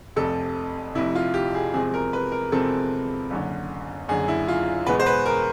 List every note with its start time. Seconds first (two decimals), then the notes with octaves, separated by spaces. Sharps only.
0.16 F1 F2 C3 A4
0.95 F1 F2 C3 E4
1.15 F4
1.34 G4
1.55 G#4
1.74 E2 C3 F3 G#3 C4 G#4
1.94 A#4
2.13 B4
2.32 A#4
2.52 E2 C3 F3 G#3 C4 A4
3.31 F#1 F#2 D3
4.08 F#1 F#2 D3 G#4
4.28 E4
4.48 F4
4.86 E2 B2 G#3 B3 B4
5.00 C5
5.06 B4
5.25 A#4